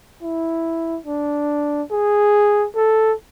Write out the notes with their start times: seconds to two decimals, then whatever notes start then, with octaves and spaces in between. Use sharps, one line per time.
0.22 E4
1.07 D4
1.91 G#4
2.76 A4